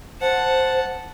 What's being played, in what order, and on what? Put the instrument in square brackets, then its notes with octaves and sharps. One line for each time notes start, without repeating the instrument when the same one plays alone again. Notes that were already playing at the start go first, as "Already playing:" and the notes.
[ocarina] C5 [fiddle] F#5 A5